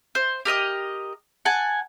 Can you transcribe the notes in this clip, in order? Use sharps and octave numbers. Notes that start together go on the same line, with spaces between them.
C5
G4 A#4 D#5 D#6
F#5 G#5 A5